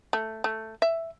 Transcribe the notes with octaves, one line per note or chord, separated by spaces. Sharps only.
A3
A3
E5